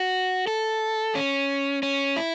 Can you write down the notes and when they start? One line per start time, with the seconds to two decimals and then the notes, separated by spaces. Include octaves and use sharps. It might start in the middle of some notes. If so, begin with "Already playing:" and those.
Already playing: F#4
0.47 A4
1.15 C#4
1.83 C#4
2.16 E4